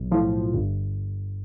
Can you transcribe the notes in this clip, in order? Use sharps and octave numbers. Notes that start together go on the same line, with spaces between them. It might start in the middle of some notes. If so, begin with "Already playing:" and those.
Already playing: B1
A2 F3
G1